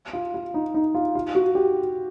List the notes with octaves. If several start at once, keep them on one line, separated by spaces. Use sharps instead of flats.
F4
F4
D#4
D#4
F4
F4
F#4
G4